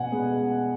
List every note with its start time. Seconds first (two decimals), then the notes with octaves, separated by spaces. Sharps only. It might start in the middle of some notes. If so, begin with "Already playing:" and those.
Already playing: B2 F#5 G#5
0.12 G#3 B3